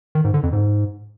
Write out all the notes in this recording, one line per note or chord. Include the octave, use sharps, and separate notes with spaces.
D#3
G#2
D3
F2
G#2